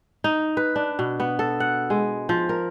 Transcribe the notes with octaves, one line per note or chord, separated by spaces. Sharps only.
D#4
B4
D4
B2
B3
A4
F#5
G#3
F3
A#4